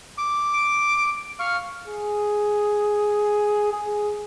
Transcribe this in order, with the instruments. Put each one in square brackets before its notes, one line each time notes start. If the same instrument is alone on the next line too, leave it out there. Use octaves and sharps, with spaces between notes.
[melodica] D6
[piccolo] D7
[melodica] F5 C#6 [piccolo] F6
[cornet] G#4
G#4